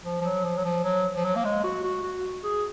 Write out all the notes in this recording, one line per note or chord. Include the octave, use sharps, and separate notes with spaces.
F3
F3
F#3
F3
F#3
F3
F#3
F3
F#3
A#3
G#3
F#4
F#4
F#4
G#4